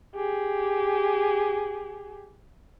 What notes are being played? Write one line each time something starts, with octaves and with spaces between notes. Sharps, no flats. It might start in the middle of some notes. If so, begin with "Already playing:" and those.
G4 G#4